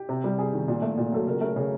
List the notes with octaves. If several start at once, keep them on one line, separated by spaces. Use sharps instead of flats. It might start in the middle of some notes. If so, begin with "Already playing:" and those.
Already playing: G4
C3
G3
C3 G#4
D#3
A#2
A3
A#2
F#3 A4
C#3 A#4
A3 A#4
C#3